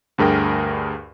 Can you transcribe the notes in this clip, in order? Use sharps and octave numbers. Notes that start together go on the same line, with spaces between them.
D2 G2 G#4 A#4 G5